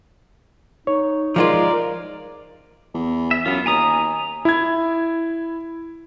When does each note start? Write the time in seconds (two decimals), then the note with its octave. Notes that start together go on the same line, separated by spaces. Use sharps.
0.87 D#4 C#5
1.36 F3 G#3 F4 A#4 D5
2.94 E2
3.31 E5
3.46 F#2 B3 F4
3.66 D#2 G#5 A#5 D#6
4.45 E4 G#6